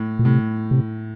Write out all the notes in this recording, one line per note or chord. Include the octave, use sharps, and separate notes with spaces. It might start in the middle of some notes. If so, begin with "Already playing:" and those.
Already playing: A2
A#2
A2 C3
C3